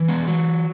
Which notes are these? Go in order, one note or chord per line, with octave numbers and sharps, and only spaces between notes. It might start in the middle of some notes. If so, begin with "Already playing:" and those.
Already playing: E3
G#3 B3
F#3